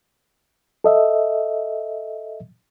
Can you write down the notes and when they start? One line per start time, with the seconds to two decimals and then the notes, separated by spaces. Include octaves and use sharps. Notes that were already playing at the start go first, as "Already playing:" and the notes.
0.84 A4 D#5 E5